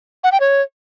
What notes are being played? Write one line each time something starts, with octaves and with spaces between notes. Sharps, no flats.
F#5
G5
C#5